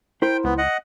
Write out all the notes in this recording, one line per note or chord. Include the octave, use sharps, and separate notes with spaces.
E4 A#4 C5 G5
C#2 B3
D#5 F#5